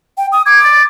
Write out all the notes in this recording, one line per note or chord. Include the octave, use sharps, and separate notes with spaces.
G5
D#6
D6 G#6
A6